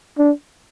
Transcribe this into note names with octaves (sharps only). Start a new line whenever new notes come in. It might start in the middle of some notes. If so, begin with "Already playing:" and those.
D4